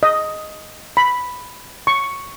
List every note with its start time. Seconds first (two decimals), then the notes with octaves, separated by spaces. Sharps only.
0.03 D#5
0.97 B5
1.87 C#6